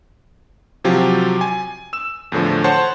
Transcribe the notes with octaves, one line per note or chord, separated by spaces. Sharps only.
C3 F3 F#3 F4 G4
G#5
E6 E7
E2 A2 D3 F3
C5 C#5 F#5 A5 C6